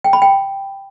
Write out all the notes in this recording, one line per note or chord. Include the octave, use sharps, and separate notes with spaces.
G5
B5
G5